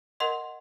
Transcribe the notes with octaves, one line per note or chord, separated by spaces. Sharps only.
A#4 D#5 F#5 C6